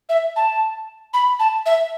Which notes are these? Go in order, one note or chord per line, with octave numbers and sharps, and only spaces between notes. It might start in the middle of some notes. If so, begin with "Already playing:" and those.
E5
A5
B5
A5
E5